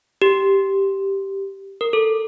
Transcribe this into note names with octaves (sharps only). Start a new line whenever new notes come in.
G4
A#4
A4